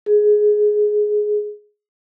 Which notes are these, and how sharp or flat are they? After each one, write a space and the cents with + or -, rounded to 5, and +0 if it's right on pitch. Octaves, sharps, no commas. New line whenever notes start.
G#4 +10